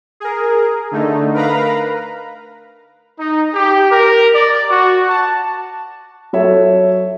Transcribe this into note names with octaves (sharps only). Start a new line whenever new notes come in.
G#4 A#4
D3 A3 D#4
A#4 B4 F5 A#5 B5
D#4
G4
A#4
D5
F#4
A5
F#3 A4 C#5 E5